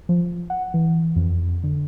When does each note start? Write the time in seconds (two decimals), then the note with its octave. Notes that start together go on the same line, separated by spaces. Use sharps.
0.09 F3
0.50 F#5
0.74 E3
1.16 F2
1.63 D3